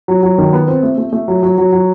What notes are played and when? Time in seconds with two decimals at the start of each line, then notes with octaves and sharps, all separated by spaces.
0.08 F#3
0.23 F#3
0.38 D#3
0.53 B3
0.68 C4
0.83 A3
0.98 A3
1.13 A3
1.28 F#3
1.43 F#3
1.58 F#3
1.72 F#3